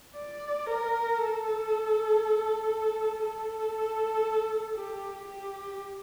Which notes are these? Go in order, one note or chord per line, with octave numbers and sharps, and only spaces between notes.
D5
A#4
A4
A4
G4
G4